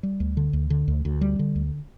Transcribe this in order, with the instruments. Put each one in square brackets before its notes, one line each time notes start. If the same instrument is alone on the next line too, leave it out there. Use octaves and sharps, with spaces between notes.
[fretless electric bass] G3
D2
D3
D2
D3
D2
D2
G3
D3
D2